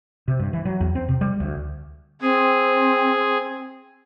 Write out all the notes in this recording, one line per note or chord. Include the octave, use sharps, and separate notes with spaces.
C3
G2
E3
F#3
E2
C4
C3
G3
D2
C4 G#4